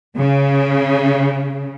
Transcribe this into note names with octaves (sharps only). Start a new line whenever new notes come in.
C#3